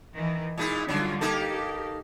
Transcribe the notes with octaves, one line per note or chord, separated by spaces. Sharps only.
D#3 E3
A#2 G#3 D#4 E4
D3 F#3 G3 F4
A#3 D#4 G4 A4